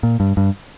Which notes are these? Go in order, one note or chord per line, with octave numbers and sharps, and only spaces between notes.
A#2
G2
G2